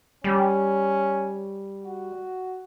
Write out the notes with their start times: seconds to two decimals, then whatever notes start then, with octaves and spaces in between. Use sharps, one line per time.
0.24 G3 C#4
1.84 F#4